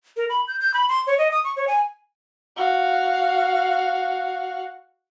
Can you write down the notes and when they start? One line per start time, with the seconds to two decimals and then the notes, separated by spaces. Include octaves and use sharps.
0.17 A#4
0.29 B5
0.48 G6
0.60 G6
0.74 B5
0.89 C6
1.07 C#5
1.18 D#5
1.31 D#6
1.44 C#6
1.56 C#5
1.68 G#5
2.56 F#4 F5